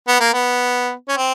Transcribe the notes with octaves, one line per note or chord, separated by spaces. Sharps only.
B3
A#3
B3
C#4
C4